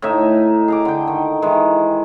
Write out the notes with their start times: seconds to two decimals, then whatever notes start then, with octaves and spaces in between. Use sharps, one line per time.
0.02 A2 D#4 E5
0.68 G#4 A#5 D6
0.85 D3 G5
1.07 D#3
1.42 D#3 E3 G#3